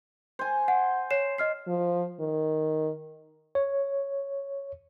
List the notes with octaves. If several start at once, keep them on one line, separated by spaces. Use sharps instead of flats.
C5 G#5
F#5
C#5 C7 E7
D#5 F6 C7
F3
D#3
C#5